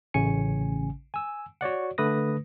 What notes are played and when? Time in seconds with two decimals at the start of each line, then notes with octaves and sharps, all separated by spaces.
0.14 A1 C#3 C#4 G#5 C#7
1.14 G#5 E6
1.61 F#4 C#5 D5 F#5
1.98 D3 A3 B4 D#6 A#6